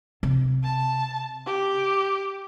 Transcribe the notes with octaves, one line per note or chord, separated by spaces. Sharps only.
C3
A5
G4